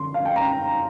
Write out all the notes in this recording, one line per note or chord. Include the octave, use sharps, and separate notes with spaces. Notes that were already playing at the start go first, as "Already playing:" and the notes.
Already playing: D3 C6
F5
G5
A#5